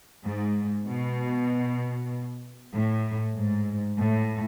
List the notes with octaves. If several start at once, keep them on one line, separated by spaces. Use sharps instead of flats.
G#2
B2
A2
G#2
A2